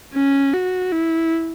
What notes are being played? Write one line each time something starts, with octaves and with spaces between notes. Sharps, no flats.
C#4
F#4
E4